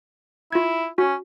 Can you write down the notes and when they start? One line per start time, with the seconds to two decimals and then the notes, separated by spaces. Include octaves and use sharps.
0.52 E4 F4 G#6
0.98 C#4 F#4